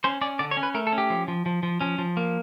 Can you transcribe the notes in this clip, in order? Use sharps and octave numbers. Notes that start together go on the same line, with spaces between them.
C#4 C5
C#4 D5
D3 D5
C#5
C#4
B4
A3 A#4
A4
C#4
G4
F3
F3
F3
F3
F3 C#4
F3
A#3